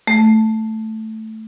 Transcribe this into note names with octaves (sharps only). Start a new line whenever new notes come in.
A3